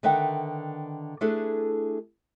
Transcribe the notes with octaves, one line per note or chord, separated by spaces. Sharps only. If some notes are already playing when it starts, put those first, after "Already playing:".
D3 D#3 B4 E5 F#5 G5
A3 D4 E4 G#4 A4 B4